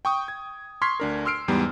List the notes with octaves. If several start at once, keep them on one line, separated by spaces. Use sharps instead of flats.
G5 C#6 D#6
G#6
C6 C#6 F6 G#6 B6 C7
D2 D4 A#4
C6 E6 F6 C7 D7
E2 G#2 G3 B3